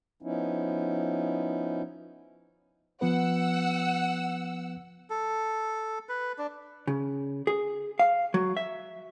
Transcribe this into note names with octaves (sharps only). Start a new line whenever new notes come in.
F3 B3 C#4 D#4 E4
F3 B3 B4 F#5 E6
A4
B4
D4
C#3
G#4
F5
F#3
E5